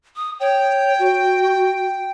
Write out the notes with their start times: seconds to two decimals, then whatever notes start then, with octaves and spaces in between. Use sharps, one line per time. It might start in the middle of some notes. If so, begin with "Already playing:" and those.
0.16 D#6
0.40 C#5 G5
0.99 F#4